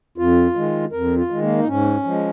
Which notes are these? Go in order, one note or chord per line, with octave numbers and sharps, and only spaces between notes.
F2 F4
D#3 G#3
F2 A#4
F4
D#3 G#3
A#3
D#4
G#2 C#4
F3 G#3